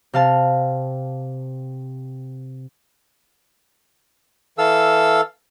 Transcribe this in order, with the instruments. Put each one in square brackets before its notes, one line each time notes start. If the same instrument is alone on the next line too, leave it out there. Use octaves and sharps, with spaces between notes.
[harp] C3 F5 A5
[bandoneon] E3 A4 F5 E6